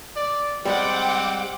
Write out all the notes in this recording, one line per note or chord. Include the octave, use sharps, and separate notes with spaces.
D5
G3 G#3 C4 F#5 G5 D6